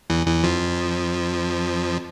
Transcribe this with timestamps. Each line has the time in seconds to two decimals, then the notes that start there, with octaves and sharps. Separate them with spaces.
0.10 E2 E3
0.27 E2 E3
0.44 F2 F3